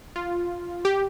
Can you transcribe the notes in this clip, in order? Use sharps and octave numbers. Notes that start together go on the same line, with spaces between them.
F4
G4